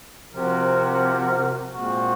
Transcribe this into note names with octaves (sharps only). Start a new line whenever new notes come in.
C3 F3 C4 F#4 A#4
A#2 G#3 C4 F#4